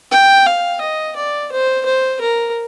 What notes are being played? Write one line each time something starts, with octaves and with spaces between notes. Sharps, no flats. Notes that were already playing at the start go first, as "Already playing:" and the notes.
G5
F5
D#5
D5
C5
C5
A#4